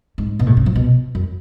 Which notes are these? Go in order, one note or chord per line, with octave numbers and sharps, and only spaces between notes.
G#2
B2
A2
C#3
F3
B2
F#2